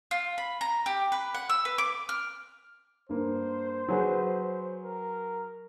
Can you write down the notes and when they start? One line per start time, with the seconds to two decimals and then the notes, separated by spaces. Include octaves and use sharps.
0.11 F4
0.38 B5
0.61 A#5
0.86 G4
1.12 B4
1.34 F#5
1.50 E6
1.65 B4
1.78 D6
2.09 F6
3.09 G2 A#3 C5
3.88 F#3 G#4 B4
4.83 A#4